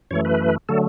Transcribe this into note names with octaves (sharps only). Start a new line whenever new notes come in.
F#2 E3 A3 C#5
B4
D3 F#3 A3 A4